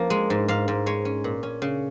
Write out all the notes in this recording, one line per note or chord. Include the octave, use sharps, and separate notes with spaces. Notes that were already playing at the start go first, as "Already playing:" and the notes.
Already playing: F3 A#3 C#4
G#3
G#2
G#2 F5
G#2
G#3 C#5
C#4
A#2
C#4
C#3